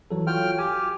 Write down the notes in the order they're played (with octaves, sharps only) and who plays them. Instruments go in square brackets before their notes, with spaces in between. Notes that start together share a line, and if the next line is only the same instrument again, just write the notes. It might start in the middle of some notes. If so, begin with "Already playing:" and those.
[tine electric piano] E3 F#3 A4
[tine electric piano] F4 F#4 C#5 [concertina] G5 F6
[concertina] G4 [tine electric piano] G#5